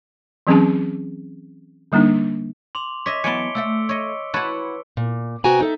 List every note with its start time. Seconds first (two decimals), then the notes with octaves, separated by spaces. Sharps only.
0.47 E3 F#3 C4 C#4 G#4 A5
1.92 D3 G3 A#3 D4 D#4
2.75 C6 D6 F7
3.06 C#5 D#5 E5 D6 B6
3.24 E3 F#3 B3 G#5 A5 C#7 D7 G7
3.55 A3 D5 E5 E6
3.89 C#5 D#5
4.34 E4 F#4 B4 C#5 A5
4.97 A#2
5.44 C3 B3 F#4 G5 G#5 A#5
5.60 D#4 A4 E5